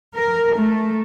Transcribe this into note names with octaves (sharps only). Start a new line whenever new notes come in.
A#4
A3